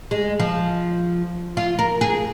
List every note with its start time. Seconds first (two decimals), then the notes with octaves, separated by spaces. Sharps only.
0.11 G#3
0.40 F3
1.57 F4
1.79 A#4
2.01 G#4